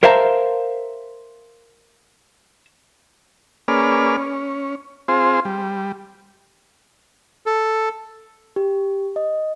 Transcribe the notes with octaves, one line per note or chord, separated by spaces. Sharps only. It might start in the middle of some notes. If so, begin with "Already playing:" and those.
A#4 C5 E5 F5 A5 A#5
A#3 C#4 G#4 B4 D5 F6
C#4
C4 F4 G#4 C5
G3
A4
G4
D#5